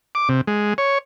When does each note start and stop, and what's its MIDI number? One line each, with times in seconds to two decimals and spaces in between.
0.15 0.29 86
0.29 0.41 48
0.47 0.74 56
0.78 0.98 73